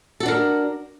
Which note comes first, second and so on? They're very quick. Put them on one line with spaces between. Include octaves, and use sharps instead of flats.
A4 F#4 D4 A#4